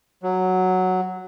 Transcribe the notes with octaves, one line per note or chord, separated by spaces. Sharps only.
F#3